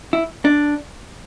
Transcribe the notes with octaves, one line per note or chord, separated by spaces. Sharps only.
E4
D4